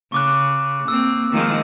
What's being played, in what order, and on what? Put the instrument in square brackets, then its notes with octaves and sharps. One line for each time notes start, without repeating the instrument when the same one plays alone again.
[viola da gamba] C#3 [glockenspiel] C#6 D6 F#6
[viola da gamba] A#3 C4 [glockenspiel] E6
[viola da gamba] D#3 F3 G#3